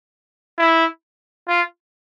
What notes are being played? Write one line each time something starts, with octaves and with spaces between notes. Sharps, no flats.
E4
F4